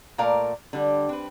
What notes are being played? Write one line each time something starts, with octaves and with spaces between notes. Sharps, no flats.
A#2 A3 A#4 D5 F5
D3 G3
C4 B4